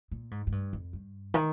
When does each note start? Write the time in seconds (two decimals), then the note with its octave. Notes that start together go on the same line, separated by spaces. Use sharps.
0.11 A#2
0.31 G#2
0.47 G#2
0.52 G2
0.73 F2
0.93 G2
1.34 D#3